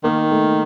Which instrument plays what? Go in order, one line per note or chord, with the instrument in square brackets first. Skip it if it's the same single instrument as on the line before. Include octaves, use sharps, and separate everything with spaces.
[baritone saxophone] D#3 [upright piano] A#3
[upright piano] A3